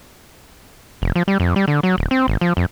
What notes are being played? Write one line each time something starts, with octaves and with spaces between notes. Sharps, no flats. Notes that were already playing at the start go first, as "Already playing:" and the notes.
F1
F3
G3
F2
G3
D3
F#3
D1
C4
G#1
F3
F2